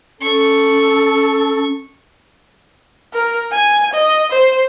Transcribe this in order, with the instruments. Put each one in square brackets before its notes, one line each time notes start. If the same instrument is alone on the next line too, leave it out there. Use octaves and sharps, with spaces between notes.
[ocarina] C#4 [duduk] A4 [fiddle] C#6
[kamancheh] A#4
G#5
D#5
C5